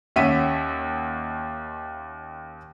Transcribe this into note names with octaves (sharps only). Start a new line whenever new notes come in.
D#2 C#4 E5 F#5 B6 D#7